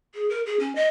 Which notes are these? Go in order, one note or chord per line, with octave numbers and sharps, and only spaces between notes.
G#4
A#4
G#4
C#4
D#5